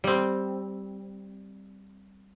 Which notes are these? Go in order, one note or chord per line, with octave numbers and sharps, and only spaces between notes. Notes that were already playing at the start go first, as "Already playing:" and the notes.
G3 C4